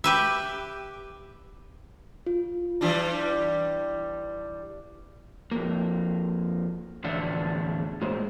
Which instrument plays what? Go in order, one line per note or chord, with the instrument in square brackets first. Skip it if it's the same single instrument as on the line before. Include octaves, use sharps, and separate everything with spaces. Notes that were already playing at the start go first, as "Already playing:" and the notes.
[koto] G4 B4 E5
[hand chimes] F4
[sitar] E3 G3 D4
[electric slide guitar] F2 A#3
E2 A2 D3 D4 E5 F#5
A2 G#3 A#3 C5